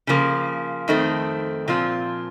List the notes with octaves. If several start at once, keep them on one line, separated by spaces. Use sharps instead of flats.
C#3 F3 A#3
F2 D#3 A3 C4
A#2 F3 C4 F4